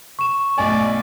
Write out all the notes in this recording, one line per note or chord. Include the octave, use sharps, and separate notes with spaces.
C#6 E7
B1 A3 D5 G#5